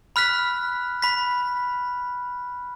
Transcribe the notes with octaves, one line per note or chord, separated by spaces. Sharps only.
B5 F6 F#6 B6
B5 B6